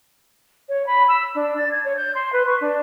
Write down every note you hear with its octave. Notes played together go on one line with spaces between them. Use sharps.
C#5
B5
E6
D4
A6
G#6
C#5
G6
C6
B4
C#6
D4